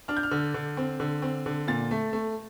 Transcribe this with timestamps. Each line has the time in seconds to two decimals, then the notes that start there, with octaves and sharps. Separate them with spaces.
0.08 D4 F6
0.17 G6
0.23 F6
0.31 D3
0.54 D3
0.77 C4
1.00 D3
1.22 C4
1.46 D3
1.67 A#2 A6
1.91 A3
2.13 A3